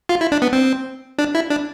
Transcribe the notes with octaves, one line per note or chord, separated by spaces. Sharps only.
F4
E4
D4
B3
C4
D4
E4
D4